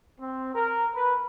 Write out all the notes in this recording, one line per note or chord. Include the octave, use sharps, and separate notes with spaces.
C4
A#4
B4